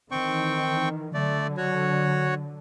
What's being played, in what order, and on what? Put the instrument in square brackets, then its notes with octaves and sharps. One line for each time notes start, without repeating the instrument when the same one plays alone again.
[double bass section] D#3 E3 [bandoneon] C4 G5 C#6
[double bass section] D3 F#3 [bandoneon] A3 D5
[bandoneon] F#4 C#5